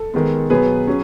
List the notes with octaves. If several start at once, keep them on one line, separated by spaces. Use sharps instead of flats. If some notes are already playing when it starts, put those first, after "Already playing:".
Already playing: A4
D#3 G#3 B3
B2 F#3 B3 G#4 B4
F#3 C#4